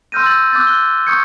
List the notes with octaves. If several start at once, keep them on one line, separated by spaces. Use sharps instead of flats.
C6 E6 F6 G6 A#6 D#7
E6 G6 A6 F#7
D6 E6 F#6 G6 A6
E6 F#6 G7
C#6 D#6 G6 G#6 C#7